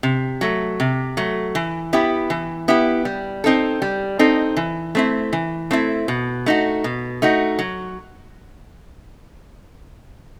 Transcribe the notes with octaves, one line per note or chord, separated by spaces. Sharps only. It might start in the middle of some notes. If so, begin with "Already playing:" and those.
C3
F#3 A3
C3
F#3 A3
E3
B3 E4 G4
E3
B3 E4 G4
G3
C4 D#4 A4
G3
C4 D#4 A4
E3
A3 C4 E4
E3
A3 C4 E4
B2
A3 D#4 F#4
B2
A3 D#4 F#4
F#3